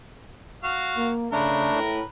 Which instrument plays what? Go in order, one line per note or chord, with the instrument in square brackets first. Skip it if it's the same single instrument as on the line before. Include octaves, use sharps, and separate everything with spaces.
[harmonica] F#4 F5
[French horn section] A#3
[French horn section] C#3 [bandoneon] A3 D4 [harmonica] A#4 B4
[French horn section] A2